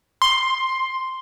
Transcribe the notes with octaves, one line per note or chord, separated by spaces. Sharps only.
C6